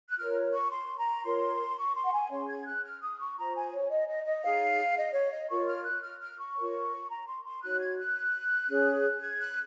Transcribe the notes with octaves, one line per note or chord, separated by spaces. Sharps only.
F#6
F4 A#4 C#5 F6
C#6
C6
A#5
F4 A#4 C#5 C6
C#6
C6
F#5
G#5
C#4 G#4 C#5 C6
G#6
F#6
F6
D#6
C#6
F4 C5 A#5
G#5
C#5
D#5
D#5
D#5
D#4 G#4 C#5 F5
D#5
C#5
D#5
F4 A#4 C#5 C#6
F6
F#6
F6
F6
C#6
F4 A#4 C#5
A#5
C6
C6
D#4 F#4 C#5 F#6
G#6
F#6
C#4 G#4 C#5
G#6
F#6